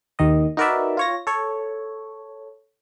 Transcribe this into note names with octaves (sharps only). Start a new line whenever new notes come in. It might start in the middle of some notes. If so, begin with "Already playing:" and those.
D#2 D#3 D#5
D#4 F#4 A#4 B4 D5 E5
F4 C#5 A#6
A4 C#5